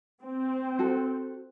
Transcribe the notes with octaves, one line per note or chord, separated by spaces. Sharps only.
C4
F#4 A4